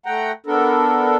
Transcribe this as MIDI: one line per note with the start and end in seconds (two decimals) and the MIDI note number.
0.06 0.32 57
0.06 0.32 78
0.06 0.32 79
0.06 0.32 82
0.46 1.17 59
0.46 1.17 62
0.46 1.17 69
0.46 1.17 70